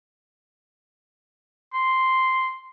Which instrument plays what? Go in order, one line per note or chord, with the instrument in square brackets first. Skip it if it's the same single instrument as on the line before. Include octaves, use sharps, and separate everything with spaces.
[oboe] C6